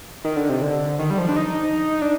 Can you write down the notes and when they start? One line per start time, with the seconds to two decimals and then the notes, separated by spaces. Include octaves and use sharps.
0.24 D#3
0.36 D3
0.49 C3
0.62 D3
0.99 D#3
1.11 G3
1.18 F3
1.29 D4
1.36 D#4
2.02 D4